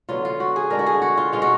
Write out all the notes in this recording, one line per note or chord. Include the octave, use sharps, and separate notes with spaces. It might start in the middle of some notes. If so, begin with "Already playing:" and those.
D3 F#3 B3 F4
F4
F#4
G#4
D3 G#3 D4 A#4
F#4
G#4
F#4
F4
B2 G#3 D#4 F4
F#4